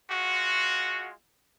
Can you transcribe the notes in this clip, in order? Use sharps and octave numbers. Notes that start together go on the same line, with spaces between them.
G#3 F4 F#4